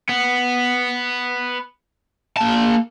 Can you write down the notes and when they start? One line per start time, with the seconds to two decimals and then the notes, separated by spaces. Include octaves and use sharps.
0.09 B3
2.37 A#3 A5